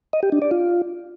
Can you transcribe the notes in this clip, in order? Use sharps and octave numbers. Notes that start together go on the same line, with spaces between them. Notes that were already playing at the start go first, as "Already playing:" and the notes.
D#5
G4
D4
D5
F4